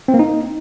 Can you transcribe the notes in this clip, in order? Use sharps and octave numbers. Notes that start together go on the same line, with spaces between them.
C4
A#3
D#4